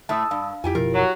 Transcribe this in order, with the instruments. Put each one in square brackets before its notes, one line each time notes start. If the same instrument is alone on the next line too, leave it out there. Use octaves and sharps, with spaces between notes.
[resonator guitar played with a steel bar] A2 A3 E5 [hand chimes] A5 D#6 E6
[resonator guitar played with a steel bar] G2 [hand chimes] F5
[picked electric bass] F2 [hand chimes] E4 F4 [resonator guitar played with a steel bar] G4 G5 G#5
[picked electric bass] F#1 B2 F3 [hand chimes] G4 [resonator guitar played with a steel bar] A#4
[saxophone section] F#3